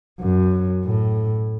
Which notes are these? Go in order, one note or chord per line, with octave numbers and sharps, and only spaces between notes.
F#2
A2